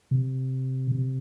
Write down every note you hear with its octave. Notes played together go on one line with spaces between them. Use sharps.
C3
C3